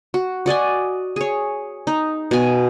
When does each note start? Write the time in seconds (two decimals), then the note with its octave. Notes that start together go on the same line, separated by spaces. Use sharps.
0.14 F#4
0.46 F#4 D5 D#5 G#5
1.16 G#4 C#5
1.87 D#4
2.31 B2 G#5